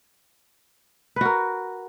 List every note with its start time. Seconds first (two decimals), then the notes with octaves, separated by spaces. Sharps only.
1.16 B4
1.21 F#4
1.25 A#4